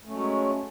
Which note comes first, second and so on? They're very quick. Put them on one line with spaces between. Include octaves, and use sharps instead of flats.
A3 C#4 F#3 G#3